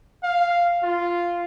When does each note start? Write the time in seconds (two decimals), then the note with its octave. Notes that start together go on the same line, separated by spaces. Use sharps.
0.24 F5
0.83 F4